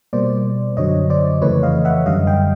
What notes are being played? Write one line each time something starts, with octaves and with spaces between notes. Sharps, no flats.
B2 G3 A#3 C5 D5
F#2 D3 F#3 C#5 D#5
C5 D5
F2 C#3 E3 A3 B4 C#5
D#5 F5
E5 F#5
F#2 D3 G3 D#5 F5
F5 G5